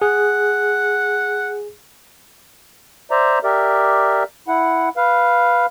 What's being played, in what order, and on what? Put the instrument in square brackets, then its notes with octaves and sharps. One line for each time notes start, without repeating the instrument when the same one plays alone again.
[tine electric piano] G#4 [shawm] F#5
[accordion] C5 D5 E5 A#5
G4 A#4 D5 E5
E4 F#5
B4 F5